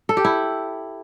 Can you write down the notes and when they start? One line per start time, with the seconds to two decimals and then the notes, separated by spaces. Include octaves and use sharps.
0.09 A4
0.17 G4
0.25 E4